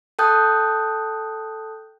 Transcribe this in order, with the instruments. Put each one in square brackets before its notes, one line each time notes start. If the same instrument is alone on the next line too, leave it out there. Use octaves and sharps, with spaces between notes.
[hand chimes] A4 G5 A5 D#6 F#6 G6